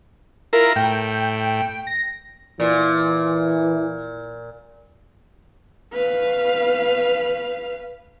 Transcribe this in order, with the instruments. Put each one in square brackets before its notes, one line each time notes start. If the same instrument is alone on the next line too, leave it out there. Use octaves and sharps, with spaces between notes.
[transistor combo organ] E4 F4 A#5 [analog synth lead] A#4
[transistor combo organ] A2 [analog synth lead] G5
[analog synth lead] A#6
[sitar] A#2 [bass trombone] E3
[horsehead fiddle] B4 F5